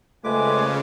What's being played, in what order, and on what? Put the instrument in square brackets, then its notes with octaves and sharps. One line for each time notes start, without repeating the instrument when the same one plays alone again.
[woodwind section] F2 B4 G#5 [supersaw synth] C#3 [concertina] G#3 D6 [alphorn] A3